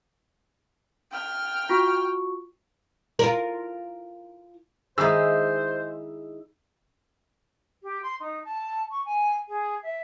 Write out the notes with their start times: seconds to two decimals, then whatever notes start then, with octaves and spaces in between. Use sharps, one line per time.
1.12 G5 F6
1.69 F4 F#4 C#6
3.19 F4 A#4
4.98 D#3 G#3 D#4 E4 G#4 C5 E6
7.83 G4
8.03 C6
8.20 D#4
8.45 A5
8.91 C#6
9.05 G#5
9.49 G#4
9.83 E5